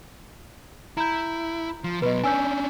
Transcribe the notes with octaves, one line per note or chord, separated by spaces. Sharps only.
E4 A#5 G6
F3
B2 F#3 B4 D#5
C#4 D4 G#5 E6 G6